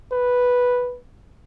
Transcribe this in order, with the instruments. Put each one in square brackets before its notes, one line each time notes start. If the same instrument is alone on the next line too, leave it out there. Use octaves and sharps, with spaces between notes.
[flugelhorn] B4